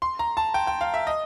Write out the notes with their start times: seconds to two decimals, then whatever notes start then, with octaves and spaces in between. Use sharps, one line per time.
0.02 C6
0.19 A#5
0.37 A5
0.54 G5
0.67 G5
0.81 F5
0.94 E5
1.07 D#5